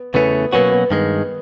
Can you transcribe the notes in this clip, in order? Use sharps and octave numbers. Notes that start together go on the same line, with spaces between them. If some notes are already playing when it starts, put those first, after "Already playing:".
Already playing: B3
E2 C#3 E3 A3 B3 C#4
B2 F#3 A#3 B3 C#4 F#4
B3
G2 D#3 G#3 B3